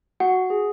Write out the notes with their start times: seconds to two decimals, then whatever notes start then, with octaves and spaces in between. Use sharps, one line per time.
0.20 F#4 F#5
0.50 G#4